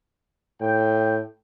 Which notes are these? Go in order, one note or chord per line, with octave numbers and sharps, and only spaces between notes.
A2 G5